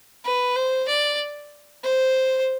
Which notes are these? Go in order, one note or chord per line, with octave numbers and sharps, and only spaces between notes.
B4
C5
D5
C5